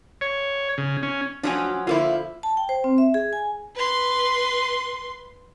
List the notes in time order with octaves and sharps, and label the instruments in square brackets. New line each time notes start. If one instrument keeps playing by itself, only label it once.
[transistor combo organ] C#5
C#3
C#4
[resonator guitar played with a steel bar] F3 F#3 C#4 [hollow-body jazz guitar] D4 F#4 G#5
[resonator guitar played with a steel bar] D3 A#3 E4 [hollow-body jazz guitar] F4 C5
[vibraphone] A5
G5
C5
C4
E5
G#4
G#5
[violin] B4 C6